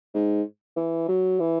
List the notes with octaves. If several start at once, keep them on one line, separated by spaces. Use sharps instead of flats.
G#2
E3
F#3
E3